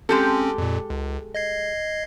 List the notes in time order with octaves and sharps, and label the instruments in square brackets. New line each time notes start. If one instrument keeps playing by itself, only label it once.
[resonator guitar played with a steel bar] G#3 G4 A4 [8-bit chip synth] C4 C#4
[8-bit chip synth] F2 A#2
C#2
D#5 G#6 C7